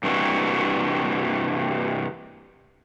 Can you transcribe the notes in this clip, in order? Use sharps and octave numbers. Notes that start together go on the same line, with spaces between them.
G2 C3 E3 F#4